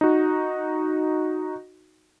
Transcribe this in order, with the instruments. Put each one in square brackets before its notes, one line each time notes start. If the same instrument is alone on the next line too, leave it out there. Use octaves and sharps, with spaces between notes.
[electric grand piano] D#4 F#4